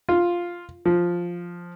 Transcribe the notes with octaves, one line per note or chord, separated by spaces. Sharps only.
F4
F3